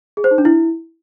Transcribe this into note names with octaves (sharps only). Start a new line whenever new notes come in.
G#4
C5
D#4
D4
E4